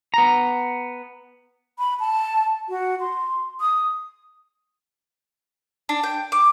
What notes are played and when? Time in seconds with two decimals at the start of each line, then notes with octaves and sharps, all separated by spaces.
0.14 B3 A#5
1.79 B5
2.00 A5
2.69 F#4
3.00 C6
3.61 D#6
5.89 D4
6.03 G5
6.32 D6